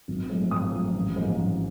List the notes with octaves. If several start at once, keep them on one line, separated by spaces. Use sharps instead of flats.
G#1
G#2 F3 A3
G#1 D#6
G#2 F3 A3
A1
G#2 F3 A#3
A1